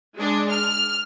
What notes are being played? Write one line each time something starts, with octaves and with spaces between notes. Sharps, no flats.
G#3 D4
F6